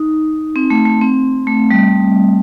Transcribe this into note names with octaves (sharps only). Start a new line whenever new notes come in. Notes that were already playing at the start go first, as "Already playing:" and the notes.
Already playing: D#4
C4
A3
A3
C4
A3
G3